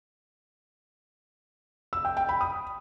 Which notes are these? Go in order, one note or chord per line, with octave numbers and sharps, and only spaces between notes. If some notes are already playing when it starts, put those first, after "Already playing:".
E6
G5
G5
B5
D#6